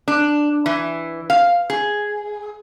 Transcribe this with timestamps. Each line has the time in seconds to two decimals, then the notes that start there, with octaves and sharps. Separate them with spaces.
0.08 D4
0.66 E3
1.30 F5
1.70 G#4